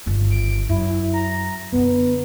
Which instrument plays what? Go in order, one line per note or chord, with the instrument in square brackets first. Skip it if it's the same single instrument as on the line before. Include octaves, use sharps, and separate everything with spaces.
[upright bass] G1 D#3
[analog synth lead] D7
[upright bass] F#2 [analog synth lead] E4
[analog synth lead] A#5
[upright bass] F#2 D3 [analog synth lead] B3